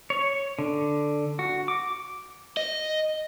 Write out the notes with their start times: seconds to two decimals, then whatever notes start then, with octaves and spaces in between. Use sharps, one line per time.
0.10 C#5
0.59 D3
1.39 F#4
1.68 D6
2.57 D#5